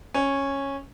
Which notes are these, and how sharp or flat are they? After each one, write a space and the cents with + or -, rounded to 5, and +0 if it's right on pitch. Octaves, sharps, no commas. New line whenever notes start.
C#4 -10